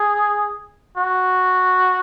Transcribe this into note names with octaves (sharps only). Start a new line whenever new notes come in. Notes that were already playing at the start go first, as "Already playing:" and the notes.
Already playing: G#4
F#4